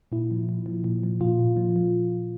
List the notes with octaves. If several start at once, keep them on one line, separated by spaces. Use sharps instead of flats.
A#2 E4
F3
A#2
F3
A#2
F3
A#2 F4
A#2
F3
F3